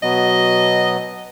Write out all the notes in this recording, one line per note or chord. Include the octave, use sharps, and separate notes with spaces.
B2 F#3 B3 D#5